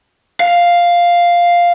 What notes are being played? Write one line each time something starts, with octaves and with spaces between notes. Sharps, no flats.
F5